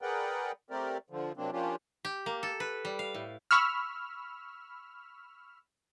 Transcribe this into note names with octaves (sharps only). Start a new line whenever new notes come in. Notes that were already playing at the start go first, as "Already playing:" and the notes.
G#4 A#4 B4 D5 F#5 G5
A3 C4 G4 A#4 D5
D3 F3
C3 F#3 A#3 C4 D4
F3 A#3 C#4 D4 F4 G4
G4
A#3
A4
B4
G3
F5
A2
B5 C#6 E6 F6